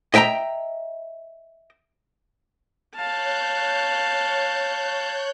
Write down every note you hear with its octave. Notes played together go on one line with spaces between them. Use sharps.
D#5 E5 G5 A5 A#5
C#5 F5 A5 F#6 G6